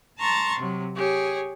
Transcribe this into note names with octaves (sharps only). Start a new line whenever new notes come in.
A5 A#5 C6 C#6 A6
C3 F#3
G4 G#4 C#5